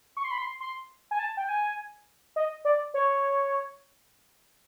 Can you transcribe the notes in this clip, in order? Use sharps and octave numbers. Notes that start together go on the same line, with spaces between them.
C#6
C6
B5
C6
C6
G#5
A5
G5
G#5
D#5
D5
C#5